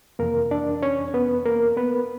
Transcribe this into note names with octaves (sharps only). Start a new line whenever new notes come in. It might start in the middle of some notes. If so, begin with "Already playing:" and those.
F2 C3 E3 A#3 A#4
D4 D5
C#4 C#5
B3 B4
A#3 A#4
B3 B4